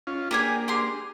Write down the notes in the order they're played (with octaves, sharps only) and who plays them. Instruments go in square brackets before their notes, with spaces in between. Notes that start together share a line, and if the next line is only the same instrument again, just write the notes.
[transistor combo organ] C#4 F4
[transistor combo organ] A#3 D4 [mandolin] G4 G#4 G#5
[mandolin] G4 G#4 C6